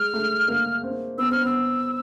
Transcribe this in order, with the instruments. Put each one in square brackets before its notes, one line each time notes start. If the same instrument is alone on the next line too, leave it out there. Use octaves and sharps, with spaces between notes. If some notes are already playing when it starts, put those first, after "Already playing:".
Already playing: [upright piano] G#3 [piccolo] F6
[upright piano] A3
A#3
C4
[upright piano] B3 [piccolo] E6
[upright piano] C4 [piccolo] F6
[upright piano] B3 [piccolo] E6